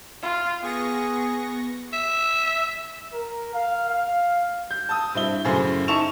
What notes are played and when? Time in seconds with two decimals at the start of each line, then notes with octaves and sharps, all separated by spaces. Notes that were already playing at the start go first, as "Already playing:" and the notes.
0.22 F4
0.62 B3 G#4 C#6 A#6
1.93 E5
3.12 A#4
3.53 F5
3.89 F5
4.71 G6
4.89 A5 D#6
5.14 G2 C4 E4 G7
5.45 F#2 A2 C#3 G#4 C5
5.88 D#4 E4 A5 C#6 E7 F7